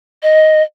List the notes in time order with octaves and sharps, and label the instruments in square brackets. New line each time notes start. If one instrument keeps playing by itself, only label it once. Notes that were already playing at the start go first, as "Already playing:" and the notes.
[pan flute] D#5